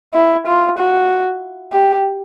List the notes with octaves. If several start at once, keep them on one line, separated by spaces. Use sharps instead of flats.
E4
F4
F#4
G4